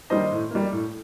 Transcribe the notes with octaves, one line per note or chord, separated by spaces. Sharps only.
D#3 G3 A#3 C5 D#5
A2
G3 A#3
A2